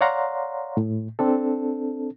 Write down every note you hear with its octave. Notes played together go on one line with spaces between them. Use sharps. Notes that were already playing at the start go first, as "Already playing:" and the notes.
C#5 D5 F5 F#5 A#5 C6
A2
C4 D4 A4